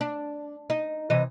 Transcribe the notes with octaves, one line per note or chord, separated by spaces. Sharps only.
D4
D#4
C3 E3 D#5